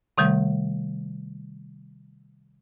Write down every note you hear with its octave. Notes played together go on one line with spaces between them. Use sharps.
C3 D#3 G3 A3